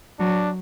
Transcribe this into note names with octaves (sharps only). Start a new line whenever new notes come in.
F#3 D4